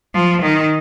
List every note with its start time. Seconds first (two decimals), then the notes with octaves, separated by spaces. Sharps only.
0.14 F3
0.42 D#3